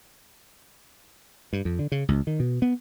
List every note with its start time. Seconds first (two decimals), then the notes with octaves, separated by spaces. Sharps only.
1.53 G2
1.65 F2
1.79 D3
1.92 C#3
2.08 C#2
2.27 D#3
2.40 B2
2.62 B3